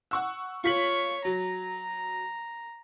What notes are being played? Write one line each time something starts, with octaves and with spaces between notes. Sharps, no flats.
F#5 C#6 E6
F4 C#5 C#6 B6 F#7
F#3 A#5